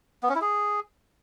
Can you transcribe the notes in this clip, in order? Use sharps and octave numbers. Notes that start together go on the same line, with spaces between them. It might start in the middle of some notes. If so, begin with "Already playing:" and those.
B3
C#4
E4
G#4